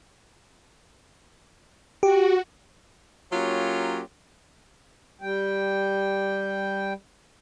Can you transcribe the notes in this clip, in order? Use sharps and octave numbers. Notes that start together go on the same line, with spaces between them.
F#4 G4
F#3 A#3 C#4 F4 G4 C#5
G3 G5